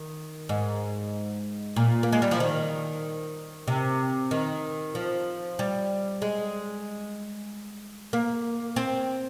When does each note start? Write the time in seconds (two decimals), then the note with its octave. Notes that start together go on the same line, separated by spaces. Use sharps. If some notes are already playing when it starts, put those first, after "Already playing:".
Already playing: D#3
0.49 G#2
1.76 A#2
2.03 A#3
2.12 G#3
2.22 G3
2.31 F3
2.40 D#3
3.67 C3
4.31 D#3
4.95 F3
5.59 G3
6.22 G#3
8.13 A#3
8.76 C4